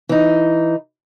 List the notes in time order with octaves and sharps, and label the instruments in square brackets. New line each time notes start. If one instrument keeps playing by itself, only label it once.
[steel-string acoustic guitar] E3 D#4